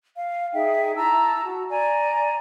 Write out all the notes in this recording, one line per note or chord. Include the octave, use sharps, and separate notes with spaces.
F5
D#4 G#4 E5 G5
E4 A5 A#5 E6
F#4
D5 G#5 A#5